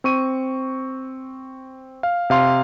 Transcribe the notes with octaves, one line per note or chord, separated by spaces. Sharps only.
C4 C#6 D#7
F5
C3 F5 C6